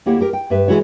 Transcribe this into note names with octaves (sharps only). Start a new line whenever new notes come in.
D2 A#3 E4 G4 C#5 F#5
G4 A#4
G5
G2 G4 B4 E5
E3 F#3 G#3 E4 F#4 C#5